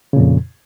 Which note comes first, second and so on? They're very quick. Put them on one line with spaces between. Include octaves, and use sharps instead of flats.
C#3 A#2 F2